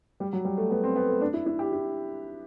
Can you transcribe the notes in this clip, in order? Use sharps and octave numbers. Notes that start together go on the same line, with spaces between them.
G3
F#3
G3
A3
B3
C4
B3
A3
D4
E4
E4
G4
E4